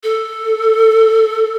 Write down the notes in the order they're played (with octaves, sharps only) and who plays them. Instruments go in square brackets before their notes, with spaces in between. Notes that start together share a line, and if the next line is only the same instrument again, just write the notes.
[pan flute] A4